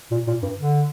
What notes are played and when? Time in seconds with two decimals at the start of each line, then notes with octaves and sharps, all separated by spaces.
0.11 A#2
0.27 A#2
0.42 G2
0.58 D3